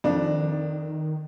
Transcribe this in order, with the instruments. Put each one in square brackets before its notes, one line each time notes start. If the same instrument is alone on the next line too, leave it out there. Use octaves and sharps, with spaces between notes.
[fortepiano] F2 D4 [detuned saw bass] D#3